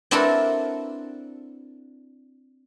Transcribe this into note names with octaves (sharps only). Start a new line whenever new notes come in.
C4 D4 E4 F#4 A4 A#4